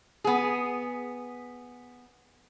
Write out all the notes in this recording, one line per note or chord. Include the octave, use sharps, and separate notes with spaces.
B3 G#4